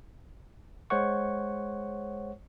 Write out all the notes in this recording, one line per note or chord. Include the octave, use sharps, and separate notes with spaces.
G#3 C5 C#5 F#5 C#6